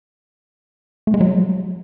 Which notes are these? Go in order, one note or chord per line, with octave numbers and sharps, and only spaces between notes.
A3
G#3
F#3